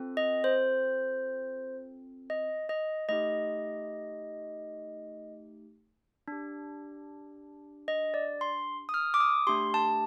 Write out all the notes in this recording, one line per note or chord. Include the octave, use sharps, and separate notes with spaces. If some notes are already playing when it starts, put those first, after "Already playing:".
Already playing: C4 F4 A4
D#5
C5
D#5
D#5
A3 D#4 G4 D#5
D4 G4
D#5
D5
C6
D#6
F6
D6
D#6
A3 D4 G4 C6
A5